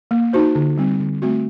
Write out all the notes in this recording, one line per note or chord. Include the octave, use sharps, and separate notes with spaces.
A#3
D#4 F#4 C5
D3
G3 C4
D3
A3 C4 F#4